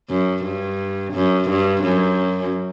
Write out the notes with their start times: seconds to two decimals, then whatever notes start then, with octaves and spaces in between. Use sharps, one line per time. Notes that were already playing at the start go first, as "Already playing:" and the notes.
0.10 F#2
0.45 G2
1.14 F#2
1.49 G2
1.84 F#2